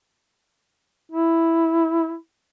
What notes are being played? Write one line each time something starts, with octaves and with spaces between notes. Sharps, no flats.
E4